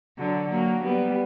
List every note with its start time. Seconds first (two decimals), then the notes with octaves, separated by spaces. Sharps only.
0.18 D3 F#3
0.50 F#3 A#3
0.84 G3 B3